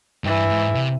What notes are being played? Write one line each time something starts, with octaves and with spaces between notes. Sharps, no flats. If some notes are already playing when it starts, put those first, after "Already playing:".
G2 E3
G#2
C3